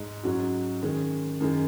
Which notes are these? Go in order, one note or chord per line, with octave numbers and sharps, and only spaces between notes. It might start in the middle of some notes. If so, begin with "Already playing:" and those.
Already playing: G#2
G#2 F#3 C#4 F#4
D#3 G#3 C#4
F#2 D#3 G#3